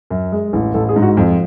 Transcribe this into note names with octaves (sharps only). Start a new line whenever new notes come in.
F#2
G#3
A1
A1 A4
G#4
G#2
F#4
F2 F4